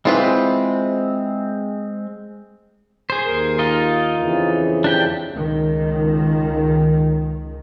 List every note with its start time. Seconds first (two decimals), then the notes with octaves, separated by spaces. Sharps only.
0.05 E3 G#3 C4 F4 B4
3.10 G#4 C5
3.25 D#2 A#4
3.59 D#4 F4 D#5
4.19 F2 C#3 E3
4.84 D4 G4 G5
5.31 C#2 D#3